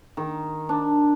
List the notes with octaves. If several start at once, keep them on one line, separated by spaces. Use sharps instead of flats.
D#3
D4